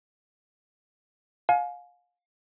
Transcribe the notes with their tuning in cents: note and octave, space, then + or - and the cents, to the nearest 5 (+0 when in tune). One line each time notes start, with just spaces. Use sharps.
F5 +30 G#5 +30